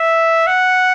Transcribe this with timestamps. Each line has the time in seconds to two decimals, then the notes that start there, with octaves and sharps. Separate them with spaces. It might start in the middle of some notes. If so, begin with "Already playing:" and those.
Already playing: E5
0.47 F#5